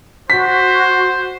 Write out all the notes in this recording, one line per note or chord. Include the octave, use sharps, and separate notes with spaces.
F#4 C5 B6